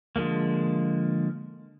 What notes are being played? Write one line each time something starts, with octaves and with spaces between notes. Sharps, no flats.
D3 F3 G#3 A#3